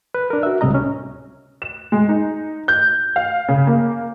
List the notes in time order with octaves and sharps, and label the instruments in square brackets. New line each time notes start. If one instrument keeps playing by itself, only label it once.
[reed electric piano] B4
D4 A#4
F#4 E5
C#2 A2 C3 G3 D#5 A#5
C#4
[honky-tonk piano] E7
G#3
D#4
G6
F5
C#3
A#3